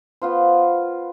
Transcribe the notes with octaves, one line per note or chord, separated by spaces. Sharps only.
B3 F4 C5